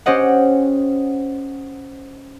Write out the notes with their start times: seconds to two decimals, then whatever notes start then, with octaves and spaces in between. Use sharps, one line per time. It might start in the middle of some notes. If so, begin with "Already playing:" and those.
0.06 C#4 G4 C5 D#5 F#5